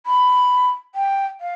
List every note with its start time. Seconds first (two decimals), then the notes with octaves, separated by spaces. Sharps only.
0.06 B5
0.95 G5
1.41 F5